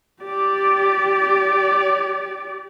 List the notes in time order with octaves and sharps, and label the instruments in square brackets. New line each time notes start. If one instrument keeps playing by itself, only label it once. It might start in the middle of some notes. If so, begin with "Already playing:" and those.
[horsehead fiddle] G4 D5